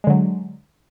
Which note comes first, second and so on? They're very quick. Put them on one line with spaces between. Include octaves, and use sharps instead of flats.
G#3 D3 F#3